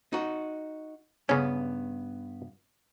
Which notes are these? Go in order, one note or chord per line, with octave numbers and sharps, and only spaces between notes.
D#4 F#4
G2 C#3 B3 C#4